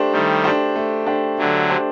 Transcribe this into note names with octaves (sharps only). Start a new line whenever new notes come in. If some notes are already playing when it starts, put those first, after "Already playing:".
Already playing: A3 D4 G4 C5
D#3 G3 A3
D4 G4 C5
A3
D4 G4 C5
D3 F#3 A3
D4 G4 C5